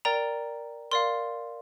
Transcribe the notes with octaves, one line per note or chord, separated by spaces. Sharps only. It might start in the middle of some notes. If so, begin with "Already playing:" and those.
A#4 D5 G5 A#5
A#4 D5 F5 C6